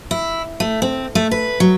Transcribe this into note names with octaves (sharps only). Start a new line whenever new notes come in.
E4
A3
C4
A3
B4
F#3